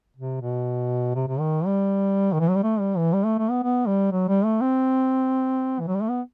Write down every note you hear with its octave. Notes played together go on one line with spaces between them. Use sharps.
C3
B2
C3
C3
D#3
G3
D#3
E3
F#3
G3
A3
G3
E3
G3
A3
A3
B3
B3
G3
F#3
G3
A3
C4
E3
F#3
G3
A3
B3